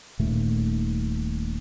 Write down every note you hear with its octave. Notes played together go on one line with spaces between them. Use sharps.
D#1 A#2 D#3 A3